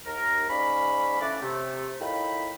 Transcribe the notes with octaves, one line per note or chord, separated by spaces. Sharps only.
D#2 A#4
G#2 C#4 D5 F5 B5
D3 A3 C#4 E4 F#4 D5
C3 A3
A2 D#3 F4 G5 B5